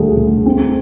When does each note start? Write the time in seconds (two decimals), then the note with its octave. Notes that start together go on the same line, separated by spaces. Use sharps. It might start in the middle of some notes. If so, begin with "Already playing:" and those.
Already playing: D2 G3 G#4
0.17 D2
0.46 C4